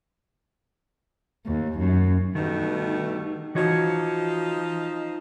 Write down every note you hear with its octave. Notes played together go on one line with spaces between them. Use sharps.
D#2
F#2
G2 B2 D#3 A3
E3 F3 D#4 F#4 C#5